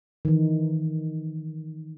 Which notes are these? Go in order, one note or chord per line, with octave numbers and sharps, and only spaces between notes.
D#3 E3